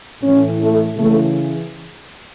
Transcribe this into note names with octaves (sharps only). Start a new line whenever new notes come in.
A2 E3 C#4
A3
C#3 E3 A3